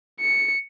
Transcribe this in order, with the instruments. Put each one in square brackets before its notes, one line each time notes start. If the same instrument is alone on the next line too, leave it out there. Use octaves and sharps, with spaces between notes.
[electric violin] C#7